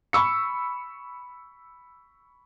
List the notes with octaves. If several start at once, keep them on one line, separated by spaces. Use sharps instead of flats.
B5 C#6 E6 C#7